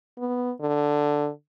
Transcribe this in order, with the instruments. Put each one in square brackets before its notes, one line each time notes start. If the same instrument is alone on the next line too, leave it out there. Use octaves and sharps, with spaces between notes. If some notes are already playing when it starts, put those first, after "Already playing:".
[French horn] B3
D3